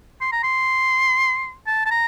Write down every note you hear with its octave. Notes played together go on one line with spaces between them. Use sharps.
C6
A#5
C6
A5
A5
A#5